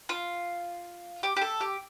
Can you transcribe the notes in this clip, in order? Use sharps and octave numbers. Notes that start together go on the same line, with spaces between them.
F4
G4
G4
A4
G4